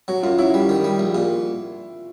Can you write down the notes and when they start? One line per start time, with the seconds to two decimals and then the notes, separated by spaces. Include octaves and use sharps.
0.08 F#3 F#4
0.23 F#2 F4
0.39 F#3 E4
0.54 G3
0.69 D#3
0.84 G3
0.99 A#1
1.15 A#2